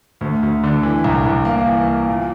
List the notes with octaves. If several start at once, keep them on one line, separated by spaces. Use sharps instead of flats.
D2
D2
D3
E3
C2
C2
A#3
E3
A#3
A#2